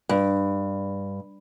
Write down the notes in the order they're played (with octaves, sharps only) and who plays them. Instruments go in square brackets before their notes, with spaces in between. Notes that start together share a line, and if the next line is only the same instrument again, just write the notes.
[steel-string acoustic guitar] G2